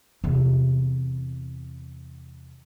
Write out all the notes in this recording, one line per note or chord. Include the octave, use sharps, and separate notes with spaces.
E2 C3